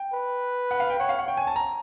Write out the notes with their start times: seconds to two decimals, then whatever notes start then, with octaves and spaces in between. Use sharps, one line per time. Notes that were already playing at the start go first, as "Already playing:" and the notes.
Already playing: G5
0.14 B4
0.71 F#5
0.80 F5
0.90 G5
1.00 C#5 F#5
1.09 F5
1.19 F#5
1.28 C#5 G5
1.37 G#5
1.47 A5
1.56 A#5